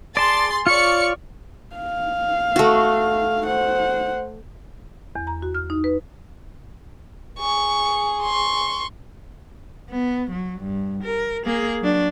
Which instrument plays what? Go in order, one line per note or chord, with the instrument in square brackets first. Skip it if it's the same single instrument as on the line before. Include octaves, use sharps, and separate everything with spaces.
[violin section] G#4 C6 A6 [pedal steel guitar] D5 A5
[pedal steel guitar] F4 C#5 [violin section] D5 C#6 C#7
[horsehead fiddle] F5
[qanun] A3 F#4
[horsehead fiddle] C5 F#5
[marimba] E2
A#5
F#4
F6
D#4
B4
[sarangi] G#4 [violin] C#6
[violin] C6 C#6
[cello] B3
F#3
G2
A#4
A#3 G#4
F#3 D4